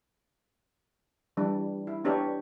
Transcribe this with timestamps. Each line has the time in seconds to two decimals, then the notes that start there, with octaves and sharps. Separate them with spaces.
1.37 E3 G3 D4
1.87 E4
2.04 B3 D4 G4 C#5